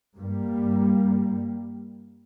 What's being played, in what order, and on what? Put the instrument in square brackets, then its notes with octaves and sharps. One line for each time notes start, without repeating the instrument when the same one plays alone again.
[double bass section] G2 G3 A#3
G2
G2